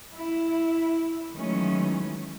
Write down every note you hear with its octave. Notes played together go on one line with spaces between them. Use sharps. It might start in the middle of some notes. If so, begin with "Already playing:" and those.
E4
D#3 E3 F#3 G#3 A3 C#4